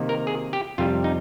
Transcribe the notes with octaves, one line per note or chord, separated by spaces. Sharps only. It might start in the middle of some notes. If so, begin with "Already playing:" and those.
Already playing: C3 D#3 A#3 D#4
A#4
G#4
G4
F2 C3 G3 F4
D#4